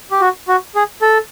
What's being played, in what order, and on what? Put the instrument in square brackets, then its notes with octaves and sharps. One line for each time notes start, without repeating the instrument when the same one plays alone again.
[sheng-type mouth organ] G4
F#4
F#4
G#4
A4